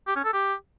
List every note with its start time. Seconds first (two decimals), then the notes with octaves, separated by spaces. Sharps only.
0.07 G4
0.16 C#4
0.25 A4
0.33 G4